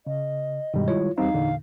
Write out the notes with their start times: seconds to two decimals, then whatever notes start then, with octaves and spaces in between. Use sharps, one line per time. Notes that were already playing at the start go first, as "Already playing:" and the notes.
0.07 C#3 D#5
0.74 G2 B2 D#3 G3 G#3
0.88 E4 F4 C#5
1.18 E2 G3 C4 D#4 F5
1.34 E2 A#2 D3